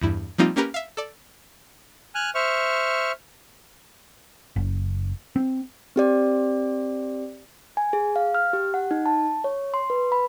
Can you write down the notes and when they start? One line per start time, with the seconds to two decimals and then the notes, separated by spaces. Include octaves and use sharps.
0.01 E2 G2 E4
0.38 F3 G3 A#3 C4 D#4 F4
0.56 A#3 C#4 G4 A#4 B4
0.74 E5 F5
0.97 A4 D5
2.15 G#5 F6 F#6
2.35 C5 E5 C#6 F6
4.56 F#1
5.36 C4
5.96 C4 G4 D5
7.77 G#5
7.93 G#4
8.16 F5
8.35 F6
8.53 G4
8.74 F#5
8.91 D#4
9.06 A5
9.44 C#5
9.74 C6
9.90 B4
10.12 B5